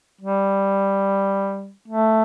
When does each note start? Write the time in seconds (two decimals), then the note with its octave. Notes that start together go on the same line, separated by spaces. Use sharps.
0.21 G3
1.88 A3